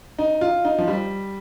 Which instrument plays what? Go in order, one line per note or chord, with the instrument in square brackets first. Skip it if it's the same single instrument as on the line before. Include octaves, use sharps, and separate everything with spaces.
[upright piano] D#4
F4
D#4
F3
G3